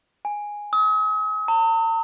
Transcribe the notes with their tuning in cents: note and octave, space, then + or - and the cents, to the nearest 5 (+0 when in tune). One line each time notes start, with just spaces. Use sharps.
G#5 -5
D#6 +45
A#5 -45